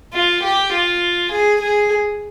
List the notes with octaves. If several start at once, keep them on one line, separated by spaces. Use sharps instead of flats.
F4
G4
F4
G#4
G#4